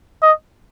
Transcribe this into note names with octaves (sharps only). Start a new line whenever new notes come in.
D#5